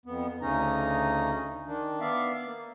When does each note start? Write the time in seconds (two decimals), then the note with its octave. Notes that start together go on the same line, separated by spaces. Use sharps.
0.06 F2 B3
0.41 D2 C#3 C#4 D#4 A#5
1.66 D#3 D4
2.00 B3 D5 E5 F5
2.46 A#3